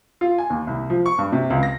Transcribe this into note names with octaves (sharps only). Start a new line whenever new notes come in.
F4
G#5
D#2
C2
F3
C#6
G2
C3
C#2
A#6